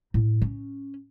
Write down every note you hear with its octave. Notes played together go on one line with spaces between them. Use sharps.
A2
C#4